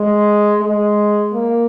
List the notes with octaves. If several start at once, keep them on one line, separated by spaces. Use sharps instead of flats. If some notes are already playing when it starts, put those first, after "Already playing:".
Already playing: G#3
G#3
A#3